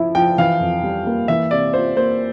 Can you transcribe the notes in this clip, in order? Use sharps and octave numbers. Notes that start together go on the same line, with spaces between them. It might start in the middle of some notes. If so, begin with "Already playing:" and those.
Already playing: F3 E4
F3 G5
E3 F5
F2
G3
A#3
E3 E5
C3 D5
F4 C5
A#3 C5